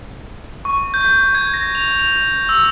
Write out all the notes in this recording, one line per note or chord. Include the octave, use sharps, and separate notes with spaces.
C#6
G6
G#6
A#6
F7
F7
E6